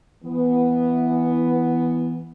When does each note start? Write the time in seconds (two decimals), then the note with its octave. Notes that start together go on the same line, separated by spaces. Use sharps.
0.24 E3 B3